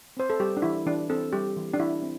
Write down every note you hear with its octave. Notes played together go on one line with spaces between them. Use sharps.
C4 C5
A4
G3 G4
D4
E3 E4
E3 D4
C4 A4
G3 G4
E3
D4
E3 E4
C4